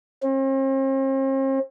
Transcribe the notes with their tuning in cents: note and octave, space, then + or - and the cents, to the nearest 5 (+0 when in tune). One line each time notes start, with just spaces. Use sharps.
C4 +45